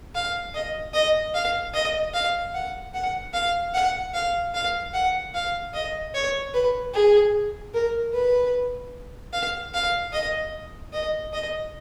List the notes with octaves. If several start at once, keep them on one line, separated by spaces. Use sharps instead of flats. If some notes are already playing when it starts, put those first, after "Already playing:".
F5
D#5
D#5
F5
D#5
F5
F#5
F#5
F5
F#5
F5
F5
F#5
F5
D#5
C#5
B4
G#4
A#4
B4
F5
F5
D#5
D#5
D#5